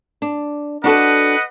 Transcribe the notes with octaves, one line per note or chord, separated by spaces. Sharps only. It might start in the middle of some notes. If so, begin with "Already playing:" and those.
D4
D4 F#4 A4 B4 D#5 F#5